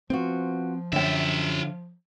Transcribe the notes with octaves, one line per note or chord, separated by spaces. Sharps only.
F3 B3 C4 F4 F#4
F#2 D3 F4 E5 G5